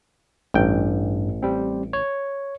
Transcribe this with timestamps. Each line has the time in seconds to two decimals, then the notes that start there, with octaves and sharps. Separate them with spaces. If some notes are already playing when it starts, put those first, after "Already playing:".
0.54 A1 G2 G5
1.43 G3 C4
1.93 C#5